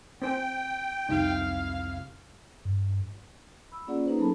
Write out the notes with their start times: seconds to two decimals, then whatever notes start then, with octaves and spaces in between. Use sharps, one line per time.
0.22 C4 C5 G5 G#5
1.09 C2 F2 C3 D#4 E4 F5
2.65 G2
3.72 B5 E6
3.87 A#3 C#4 F4 G#4 D5 F#5
4.06 A#3 C#4 D#4 G#4 B4 C5
4.18 F#3 B3 G#4 A4 A5 B5